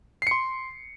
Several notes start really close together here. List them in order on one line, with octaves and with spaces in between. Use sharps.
C7 C#7 C6